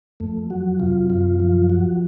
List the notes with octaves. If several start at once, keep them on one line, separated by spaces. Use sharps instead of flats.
F2 A3
F#3 F#4
C3 F4
F#2 F4
F3 F4
F3 F#4